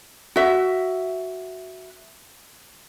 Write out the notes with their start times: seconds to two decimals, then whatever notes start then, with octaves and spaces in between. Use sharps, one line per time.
0.36 F#4 E5